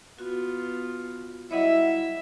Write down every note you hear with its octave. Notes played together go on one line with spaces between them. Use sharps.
B3 F4 F#4
F#3 G3 E4 C#5 D#5 E5 F#5